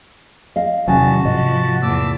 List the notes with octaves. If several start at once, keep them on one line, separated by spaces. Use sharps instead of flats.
D#5 F5
E2 C3 D#3 F#3 C#4 F#4 G#5 A5
G#2 C3 F3 D#5
E2 A#2 A5 D6 E6